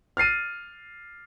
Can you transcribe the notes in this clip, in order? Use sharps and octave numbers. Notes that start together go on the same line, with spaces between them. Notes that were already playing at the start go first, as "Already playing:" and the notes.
F6 A6 C7 D#7